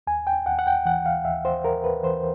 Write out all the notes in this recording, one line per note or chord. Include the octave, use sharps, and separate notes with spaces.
D#2 G#5
G5
D#2 F#5
F#5
G5
E3 F#5
F5
D#2 E5
C5
D#2 A#4
B4
E3 C5